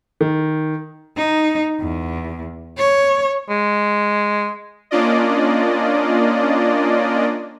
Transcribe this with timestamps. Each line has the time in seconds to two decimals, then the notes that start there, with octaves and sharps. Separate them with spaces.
0.21 D#3
1.17 D#4
1.81 E2
2.77 C#5
3.50 G#3
4.91 A#3 C#4 D4 F4 D5 D#5